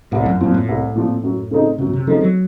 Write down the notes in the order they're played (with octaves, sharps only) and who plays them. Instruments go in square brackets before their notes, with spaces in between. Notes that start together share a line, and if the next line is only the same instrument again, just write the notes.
[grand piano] C2 [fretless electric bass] A2
[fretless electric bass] F#2
[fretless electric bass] F#2 [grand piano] A#2 F3 C4
[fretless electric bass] A2
[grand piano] C2
A#2 F3 C4
F#2
C#3 A3 C4 D#4
[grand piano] F#2 [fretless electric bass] C3
[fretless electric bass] A#2
C3
[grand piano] C#3 A3 C4 D#4 [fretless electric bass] F3
[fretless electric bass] F#3